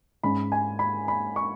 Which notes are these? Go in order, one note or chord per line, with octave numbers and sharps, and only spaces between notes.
G#2 G#3 C#4 B5
G#5
B5
B5
C#6